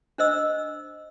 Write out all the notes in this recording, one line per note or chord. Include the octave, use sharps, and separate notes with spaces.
D4 C5 D#5 E6